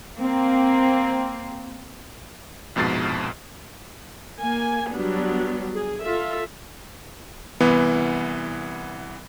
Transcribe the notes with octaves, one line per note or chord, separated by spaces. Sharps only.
A#3 C4
A#1 F2 G#2 B2 A6 C7
A#3 G#5
F#3 G3 B3 D4
G#4
F4 A4 E5
C2 E3 B3